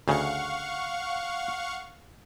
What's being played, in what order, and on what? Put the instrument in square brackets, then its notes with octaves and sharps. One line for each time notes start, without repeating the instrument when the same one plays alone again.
[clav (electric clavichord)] D2 C#3 [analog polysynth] F5 F#5 C#6